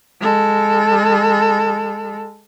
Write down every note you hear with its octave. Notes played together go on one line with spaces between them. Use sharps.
G#3 A4